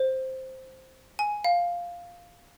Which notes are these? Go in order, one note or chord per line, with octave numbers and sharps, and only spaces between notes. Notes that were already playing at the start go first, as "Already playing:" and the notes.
Already playing: C5
G#5
F5